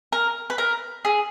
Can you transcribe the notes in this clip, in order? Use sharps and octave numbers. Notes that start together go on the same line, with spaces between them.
A#4
B4
A#4
G#4